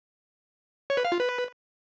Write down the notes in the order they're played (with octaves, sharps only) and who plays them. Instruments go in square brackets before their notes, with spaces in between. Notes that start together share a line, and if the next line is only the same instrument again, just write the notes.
[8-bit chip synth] C#5
B4
F5
F4
B4